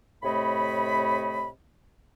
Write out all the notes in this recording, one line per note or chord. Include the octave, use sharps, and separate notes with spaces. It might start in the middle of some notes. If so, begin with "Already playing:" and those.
A2 C3 A3 C#5 D#5 B5